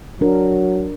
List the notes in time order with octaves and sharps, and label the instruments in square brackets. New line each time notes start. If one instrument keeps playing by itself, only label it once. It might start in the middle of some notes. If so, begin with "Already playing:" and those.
[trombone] F#3 [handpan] D4 A#4